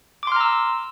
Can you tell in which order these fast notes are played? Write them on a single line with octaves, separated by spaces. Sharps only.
D6 C6 F6 A#5 E6